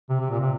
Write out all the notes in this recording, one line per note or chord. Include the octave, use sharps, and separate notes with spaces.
C3
C3
A#2
C3